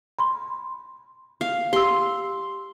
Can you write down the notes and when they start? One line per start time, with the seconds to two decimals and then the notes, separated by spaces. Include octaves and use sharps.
0.19 B5 C6
1.41 F5
1.73 G4 C6 E6